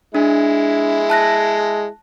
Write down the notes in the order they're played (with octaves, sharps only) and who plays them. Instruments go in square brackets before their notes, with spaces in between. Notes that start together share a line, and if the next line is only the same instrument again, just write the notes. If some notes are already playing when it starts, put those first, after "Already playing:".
[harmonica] G#3 E4 [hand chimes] D4
[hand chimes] A5 F#6 A#6